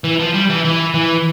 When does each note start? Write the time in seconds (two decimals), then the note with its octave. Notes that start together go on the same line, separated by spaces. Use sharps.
0.04 E3
0.19 F3
0.34 G3
0.50 E3
0.65 E3
0.94 E3